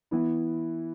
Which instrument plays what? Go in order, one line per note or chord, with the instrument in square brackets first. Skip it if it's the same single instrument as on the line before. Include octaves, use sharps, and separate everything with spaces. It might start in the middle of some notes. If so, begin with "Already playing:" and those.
[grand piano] E3 B3 E4